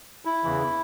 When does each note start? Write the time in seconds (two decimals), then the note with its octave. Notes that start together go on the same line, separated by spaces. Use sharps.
0.25 E4
0.44 E2 C#3 E3